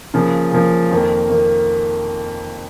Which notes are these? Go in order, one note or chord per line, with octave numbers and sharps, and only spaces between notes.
C#3 F3 A#3
C#3 F3 A#3
F2 D#3 A#3
D#3 A#3